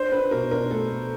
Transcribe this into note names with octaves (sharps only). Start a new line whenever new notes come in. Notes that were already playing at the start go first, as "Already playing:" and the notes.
Already playing: D4 C5
D4 B4
B2 A#4
D4 A#4
A3 A4
A3